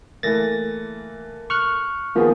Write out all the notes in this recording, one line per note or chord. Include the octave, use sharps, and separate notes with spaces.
E3 A3 A#3 A6 A#6
C#6 F6 F#6
D#3 F3 A#3 B3 G#4